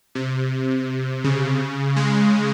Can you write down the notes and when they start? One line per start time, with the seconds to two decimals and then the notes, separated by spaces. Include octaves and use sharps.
0.15 C3
1.24 C#3
1.96 G#3